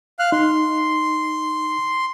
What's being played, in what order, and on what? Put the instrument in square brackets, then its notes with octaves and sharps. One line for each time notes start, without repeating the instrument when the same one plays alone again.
[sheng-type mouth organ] F5 F6 F#6
[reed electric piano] D#4 [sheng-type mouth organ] C6